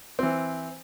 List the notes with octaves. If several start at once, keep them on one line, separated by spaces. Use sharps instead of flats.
E3 C4